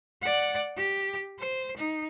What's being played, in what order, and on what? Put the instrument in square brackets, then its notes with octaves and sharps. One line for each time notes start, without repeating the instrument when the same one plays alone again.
[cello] D5 F#5
G4
C5
D#4